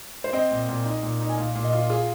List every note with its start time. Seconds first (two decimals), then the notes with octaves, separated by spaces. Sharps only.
0.24 C5
0.33 C4 D#5
0.51 A#2
0.69 A#2
0.85 D#4
1.03 A#2
1.21 D#4
1.29 G#5
1.38 A#2 F5
1.55 A#2
1.64 D#5
1.73 F4
1.90 F4 G#4